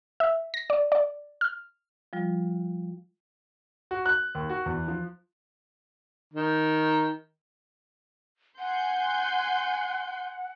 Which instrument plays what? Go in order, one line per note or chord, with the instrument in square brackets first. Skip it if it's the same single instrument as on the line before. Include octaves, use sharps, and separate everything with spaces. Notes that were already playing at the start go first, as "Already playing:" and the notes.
[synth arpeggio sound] E5
A#6
D5
D5
F6
[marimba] F3 G3 F4
[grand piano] F#4
F#6
D#2
F#4
E2
F3
[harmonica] D#3
[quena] F#5 [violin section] G#5 C6 G6